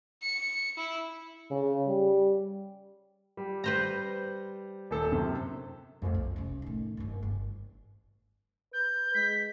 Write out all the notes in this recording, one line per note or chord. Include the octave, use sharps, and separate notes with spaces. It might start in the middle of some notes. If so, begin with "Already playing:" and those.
C#7
E4
C#3
G3
G3
B4 C5 A#5
D#1 A4
F#2 C3
F2 A2
B1
C3 C#4
A2 D#3
F#1 G2
G1
B4 G6
G#3 B6